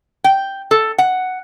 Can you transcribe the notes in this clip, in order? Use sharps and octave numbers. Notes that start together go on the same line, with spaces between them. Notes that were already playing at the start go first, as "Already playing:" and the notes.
G5
A4
F#5